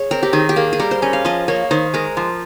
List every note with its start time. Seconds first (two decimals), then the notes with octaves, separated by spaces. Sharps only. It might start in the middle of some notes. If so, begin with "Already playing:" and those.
Already playing: G#4 C#5
0.11 C4 A#4
0.23 G4
0.33 D#3 G#4
0.49 G4
0.56 A#3 G#4
0.73 G#4
0.79 G3 A#4
0.91 C5
1.02 C#4 D#5
1.13 F5
1.25 F3 D#5
1.48 A#3 C#5
1.71 D#3 C5
1.94 G#3 A#4
2.17 F3